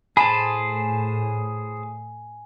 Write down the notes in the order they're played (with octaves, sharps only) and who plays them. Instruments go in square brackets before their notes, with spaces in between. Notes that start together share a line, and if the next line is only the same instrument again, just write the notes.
[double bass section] A2 [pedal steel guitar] G#4 C5 A5 [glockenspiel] G#5 [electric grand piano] B5